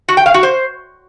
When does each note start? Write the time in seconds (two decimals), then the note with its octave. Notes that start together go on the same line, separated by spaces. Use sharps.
0.09 F#4
0.17 G5
0.26 F5
0.34 F#4
0.43 C5